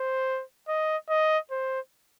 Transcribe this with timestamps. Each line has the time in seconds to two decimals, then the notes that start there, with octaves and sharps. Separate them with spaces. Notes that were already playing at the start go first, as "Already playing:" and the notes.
Already playing: C5
0.68 D#5
1.09 D#5
1.51 C5